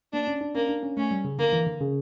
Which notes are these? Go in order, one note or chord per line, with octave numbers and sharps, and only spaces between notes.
A#3 D4
C#4
D4
A#3 C#4
D4
C#4
A3 C#4
G3
C#3
D3 A#3
E3
D3
C#3